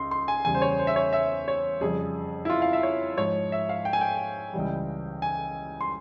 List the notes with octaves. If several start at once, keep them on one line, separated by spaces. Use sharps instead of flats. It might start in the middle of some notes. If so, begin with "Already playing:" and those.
Already playing: C#2 C#3 C6
C6
G#5
E2 C#3 G3 G#5
C5
C#5
C5
E5
C#5
E5
C#5
F2 C#3 G3 G#4
E4
F4
F5
E5
C#5
G#2 F3 C#5
E5
F5
G5
G#5
G5
C#2 C#3 E3 G3
G#5
C6